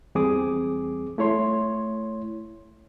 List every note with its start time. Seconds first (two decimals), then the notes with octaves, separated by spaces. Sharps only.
0.15 E2 G3 C4 G#4 D6 D#6
1.18 A3 E4 C#5 C6